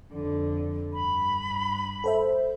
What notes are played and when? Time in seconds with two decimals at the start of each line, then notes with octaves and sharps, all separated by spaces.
0.13 F2 D3
0.93 G2 B5
2.04 A4 C5 E5